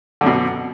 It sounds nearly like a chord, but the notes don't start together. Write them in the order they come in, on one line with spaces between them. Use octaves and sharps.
D3 F#2 B2